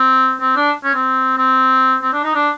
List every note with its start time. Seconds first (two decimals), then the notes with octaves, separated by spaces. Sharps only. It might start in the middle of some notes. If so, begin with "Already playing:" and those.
Already playing: C4
0.41 C4
0.56 D4
0.84 C#4
0.94 C4
1.37 C4
2.02 C4
2.13 D4
2.24 D#4
2.35 D4